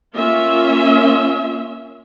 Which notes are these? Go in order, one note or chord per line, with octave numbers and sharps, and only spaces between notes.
A#3 C#4 F4 E5